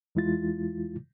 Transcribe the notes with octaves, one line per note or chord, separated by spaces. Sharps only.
E2 E3 G#3 E4 F4 A6